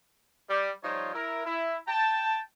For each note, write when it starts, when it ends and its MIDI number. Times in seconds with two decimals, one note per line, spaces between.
0.49 0.71 55
0.83 1.13 53
0.83 1.13 55
0.83 1.13 63
0.83 1.13 65
0.83 1.13 73
1.14 1.42 64
1.14 1.42 70
1.46 1.76 64
1.88 2.40 79
1.88 2.40 81